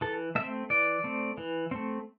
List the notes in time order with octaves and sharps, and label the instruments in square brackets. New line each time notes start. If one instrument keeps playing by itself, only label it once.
[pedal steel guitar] E3 A4
A3 C4 E5
E3 D5
A3 C4
E3
A3 C4